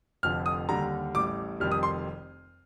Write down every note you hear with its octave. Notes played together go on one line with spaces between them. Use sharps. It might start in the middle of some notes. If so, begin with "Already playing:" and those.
F1 F2 D3 F3 F6
D#6
D#2 D3 G3 A#5
A1 A2 G3 D6
F1 F2 D#3 G3 F6
D#6
C6